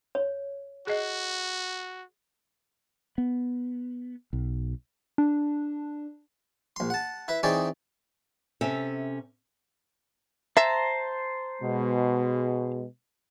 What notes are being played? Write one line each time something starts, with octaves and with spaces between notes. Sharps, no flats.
C#5
F#4 G#4 D#5
B3
B1
D4
A#1 C6
F#5 A5
E4 B4 E5
E3 C4 D#4 G#4 C#5 D5
C3 C#4 A4 E5
C5 E5 A5 A#5
B2 G#3